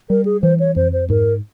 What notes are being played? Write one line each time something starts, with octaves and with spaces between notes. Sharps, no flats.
G3 A#4
G#4
E3 C5
C#5
F2 C5
C5
G#2 A#4